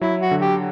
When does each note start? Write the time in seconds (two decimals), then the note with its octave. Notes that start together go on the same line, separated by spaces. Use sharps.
0.01 F#3 E4
0.21 F#4
0.31 D3
0.41 G4